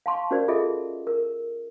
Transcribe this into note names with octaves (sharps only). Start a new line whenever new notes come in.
F5 A5 C6 C#6
C#4 F#4 A#4 C5 D5
F4 G#4 A4 D#5 E5
A#4